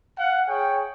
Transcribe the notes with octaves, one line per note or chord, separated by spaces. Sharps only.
F5 F#5
G#4 C#5 G5